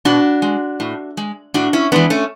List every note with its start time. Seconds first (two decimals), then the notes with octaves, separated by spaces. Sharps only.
0.05 B2 D4 F#4
0.42 G#3
0.80 A2
1.17 G#3
1.54 A2 D4 F#4
1.73 C#4 E4
1.92 E3 G#3 B3 D4
2.10 A3 C#4